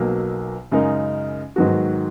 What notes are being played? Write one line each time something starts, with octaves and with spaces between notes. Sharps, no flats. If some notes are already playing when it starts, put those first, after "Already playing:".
Already playing: B1 B2 F#3 A#3
F#2 C#3 G#3 D#4 A#4
G#2 D#3 F#3 B3 F#4